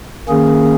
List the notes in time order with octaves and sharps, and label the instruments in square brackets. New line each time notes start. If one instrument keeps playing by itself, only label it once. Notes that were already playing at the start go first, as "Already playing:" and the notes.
[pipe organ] D#3 A#3 C#4 G#4